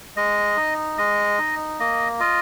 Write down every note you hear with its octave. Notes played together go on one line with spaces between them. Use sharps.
G#3 D#5
D#4
G#3 D#5
D#4
A#3 D#5
F4 D#5